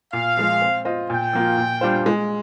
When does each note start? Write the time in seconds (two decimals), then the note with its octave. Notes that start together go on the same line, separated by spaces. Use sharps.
0.13 A#2 F5
0.37 F3 G#3
0.62 C4
0.85 F4 C5 D#5
1.10 A#2 G5
1.33 F3 A#3 F4
1.58 A#2
1.81 G3 D4 F4 C5
2.06 G#3